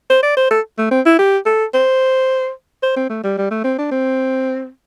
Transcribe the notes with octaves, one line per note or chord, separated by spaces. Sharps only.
C5
D5
C5
A4
A3
C4
E4
G4
A4
C5
C5
C4
A3
G3
G3
A3
C4
D4
C4